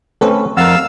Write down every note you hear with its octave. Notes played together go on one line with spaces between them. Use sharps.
A3 C4 C#4 A4 B4
F2 A#4 F5 F#5 E6 F6 A6